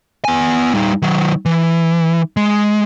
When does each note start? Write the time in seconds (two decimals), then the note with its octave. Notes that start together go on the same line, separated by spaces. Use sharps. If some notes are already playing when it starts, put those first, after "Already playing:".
0.25 B3 G#5
0.75 G3 D#4
1.02 D#3 F#3
1.46 E3
2.37 G#3